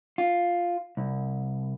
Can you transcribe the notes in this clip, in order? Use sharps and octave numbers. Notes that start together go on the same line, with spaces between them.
F4
C2